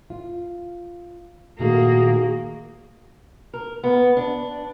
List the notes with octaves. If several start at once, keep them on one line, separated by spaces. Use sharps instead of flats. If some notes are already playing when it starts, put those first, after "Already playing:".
F4
A#2 D#3 A3 A#3 F#4 G#4
A#4
B3
D4